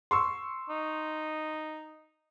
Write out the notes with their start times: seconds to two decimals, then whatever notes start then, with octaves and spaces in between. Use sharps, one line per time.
0.11 C6 C#6 E6
0.70 D#4